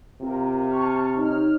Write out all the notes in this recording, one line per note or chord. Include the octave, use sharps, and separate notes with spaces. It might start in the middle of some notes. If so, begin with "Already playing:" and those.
C3 F4 A#4
A5 C#6 F6
D#4 C#5 F6